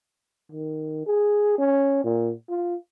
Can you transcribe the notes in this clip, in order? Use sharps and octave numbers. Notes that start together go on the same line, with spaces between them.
D#3
G#4
C#4
A#2
F4